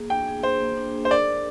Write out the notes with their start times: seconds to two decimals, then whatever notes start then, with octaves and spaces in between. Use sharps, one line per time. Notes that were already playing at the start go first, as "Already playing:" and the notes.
Already playing: A#3 G#4
0.10 D4 G5
0.28 G#4
0.43 D4 C5
0.60 A#3
0.77 D4
0.94 G#4
1.05 C5
1.11 A#4 D5
1.28 A#4